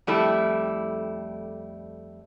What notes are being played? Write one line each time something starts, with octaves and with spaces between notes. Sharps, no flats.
F2 G3 A3 E4